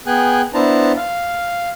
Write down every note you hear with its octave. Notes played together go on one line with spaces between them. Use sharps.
B3 G#4 G5 G#5 F#6
B3 D4 E4 C5 A5 A#5
F5